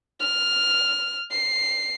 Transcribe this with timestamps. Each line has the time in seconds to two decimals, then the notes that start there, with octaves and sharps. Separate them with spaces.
0.20 F6
1.31 C7